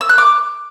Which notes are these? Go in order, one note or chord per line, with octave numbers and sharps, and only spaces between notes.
E6
F#6
D6